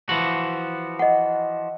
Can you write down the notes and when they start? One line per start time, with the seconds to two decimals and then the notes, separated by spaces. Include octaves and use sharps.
0.09 E3 F3 F#4 F#7
0.99 D#5 F#5